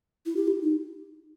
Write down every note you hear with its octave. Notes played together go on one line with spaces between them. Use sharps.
E4
G4
E4
D#4